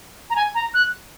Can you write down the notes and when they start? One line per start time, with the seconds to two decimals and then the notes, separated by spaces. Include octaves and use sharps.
0.30 A#5
0.36 G#5
0.55 A#5
0.74 F#6